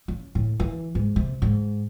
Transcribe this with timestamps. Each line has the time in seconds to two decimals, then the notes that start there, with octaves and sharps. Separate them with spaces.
0.08 C#4
0.35 A2
0.60 E3
0.95 G#2
1.16 C3
1.42 G#2